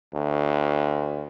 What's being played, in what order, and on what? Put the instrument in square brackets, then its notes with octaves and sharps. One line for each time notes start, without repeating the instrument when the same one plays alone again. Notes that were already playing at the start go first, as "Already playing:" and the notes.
[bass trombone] D2